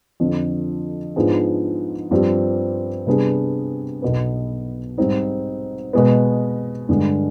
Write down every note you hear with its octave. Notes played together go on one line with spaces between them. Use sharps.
F2 D3 F3
G#2 F3 B3 D4 G#4
G2 F3 C4 G4
C3 G3 B3 D4 G#4
B1 B2 B3
G#2 G3 C4 D#4
B2 G#3 B3
G2 D3 G#3